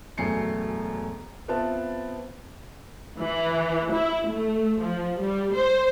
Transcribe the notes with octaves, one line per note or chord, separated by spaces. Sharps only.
E1 F#2 A3 G#5 C7 C#7
B3 C4 F4 B4 E5 A5
E3
E4
A3
F3
G3
C5